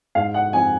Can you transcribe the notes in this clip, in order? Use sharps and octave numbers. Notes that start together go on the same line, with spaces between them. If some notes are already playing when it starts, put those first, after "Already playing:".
G#2 F5
F#5
F3 C4 G#5